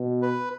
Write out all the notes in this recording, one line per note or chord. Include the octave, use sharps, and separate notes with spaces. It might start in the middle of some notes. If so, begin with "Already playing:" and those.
Already playing: B2
B4